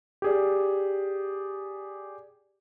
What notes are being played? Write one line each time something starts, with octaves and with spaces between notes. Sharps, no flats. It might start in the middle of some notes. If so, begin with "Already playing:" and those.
G4 G#4 D5